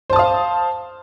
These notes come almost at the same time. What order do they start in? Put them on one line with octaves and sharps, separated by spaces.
C5 A5 D#6 F5